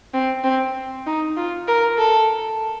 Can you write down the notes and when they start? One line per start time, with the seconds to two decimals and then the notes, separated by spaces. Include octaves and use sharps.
0.14 C4
0.44 C4
1.07 D#4
1.37 F4
1.68 A#4
1.98 A4